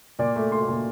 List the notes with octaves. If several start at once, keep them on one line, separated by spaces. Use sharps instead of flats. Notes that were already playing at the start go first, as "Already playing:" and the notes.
A#2 D5
A3
A3 C6
A#2